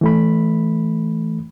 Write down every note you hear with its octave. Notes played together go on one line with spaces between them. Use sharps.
E3 A3 B5